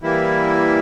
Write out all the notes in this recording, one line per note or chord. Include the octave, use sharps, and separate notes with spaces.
E3 G3 A#3 E4